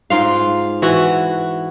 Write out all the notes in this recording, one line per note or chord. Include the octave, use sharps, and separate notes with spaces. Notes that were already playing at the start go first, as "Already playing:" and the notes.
G#2 F4 F5
E3 F#4